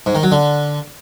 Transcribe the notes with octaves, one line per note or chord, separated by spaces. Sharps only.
G#2
D#3
F#3
D3